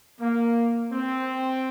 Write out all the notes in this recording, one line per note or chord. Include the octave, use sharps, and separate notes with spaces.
A#3
C4